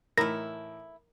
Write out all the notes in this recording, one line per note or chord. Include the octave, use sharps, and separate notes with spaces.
A2 E3 A3 D#4 E4 A#4 A#6